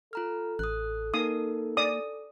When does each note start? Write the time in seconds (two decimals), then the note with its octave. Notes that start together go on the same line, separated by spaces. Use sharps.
0.13 F4 A4 A#5 F6
0.59 A1 D#6 F#6
1.14 A#3 D#4 A#4 D#6
1.77 D5 D#6